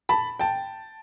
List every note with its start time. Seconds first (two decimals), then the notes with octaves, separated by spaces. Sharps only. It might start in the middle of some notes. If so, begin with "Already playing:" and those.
0.09 A5 B5
0.39 G5 A5